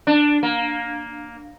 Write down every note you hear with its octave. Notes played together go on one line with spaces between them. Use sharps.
D4
A#3